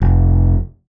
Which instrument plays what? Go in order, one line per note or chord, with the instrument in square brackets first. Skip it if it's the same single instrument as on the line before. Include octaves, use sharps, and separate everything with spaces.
[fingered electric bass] F1